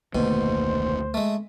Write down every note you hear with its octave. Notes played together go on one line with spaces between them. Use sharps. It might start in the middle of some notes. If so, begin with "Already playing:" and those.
F1 D2 B2 D#3 A#3 C5
G#3 A3